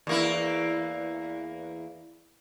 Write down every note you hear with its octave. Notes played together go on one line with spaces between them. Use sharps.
E2 A#3 E4